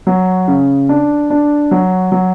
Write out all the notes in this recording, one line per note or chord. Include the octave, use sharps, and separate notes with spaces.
F#3
C#3
D4
D4
F#3
F#3